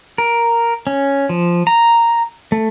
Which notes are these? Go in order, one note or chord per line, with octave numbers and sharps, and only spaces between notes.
A#4
C#4
F3
A#5
A3